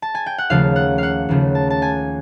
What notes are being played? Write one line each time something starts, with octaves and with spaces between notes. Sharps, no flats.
A5
G#5
G5
F#5
D#2 C#3 F3 A3 F5
F#5
F5 F#5
D#2 C#3 F3 A3
A5
A5
G#5